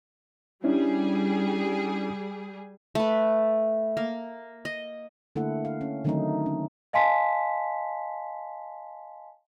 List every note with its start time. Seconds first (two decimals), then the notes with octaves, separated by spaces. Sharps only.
0.64 G3 C#4 D4 E4 G#4
2.95 A3 B4
3.97 A#3
4.65 D#5
5.36 D3 A3 A#3 E4 A4 F#5
5.65 F5
5.81 C#4
6.04 D3 D#3 F#3 A3 C4 D#4
6.46 C#4
6.93 D#5 F5 G#5 A5 C6 B6